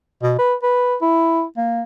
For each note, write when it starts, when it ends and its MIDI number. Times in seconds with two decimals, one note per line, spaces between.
0.23 0.35 47
0.39 0.55 71
0.63 0.95 71
1.01 1.44 64
1.57 1.82 58